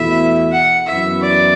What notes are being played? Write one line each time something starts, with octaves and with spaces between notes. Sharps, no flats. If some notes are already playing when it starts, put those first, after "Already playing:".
Already playing: E2 B2 A3 E4 E5
F#5
F#2 E3 B3 E4 E5
D5